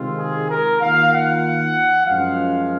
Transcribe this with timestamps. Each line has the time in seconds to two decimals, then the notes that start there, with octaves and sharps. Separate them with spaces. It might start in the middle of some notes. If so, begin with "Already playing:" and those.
Already playing: C3 D#3 G#3 C4 F4
0.18 G#4
0.49 A#4
0.80 D#3 A#3 F4 F5
1.11 F#5
2.05 F#2 F3 G#3 F5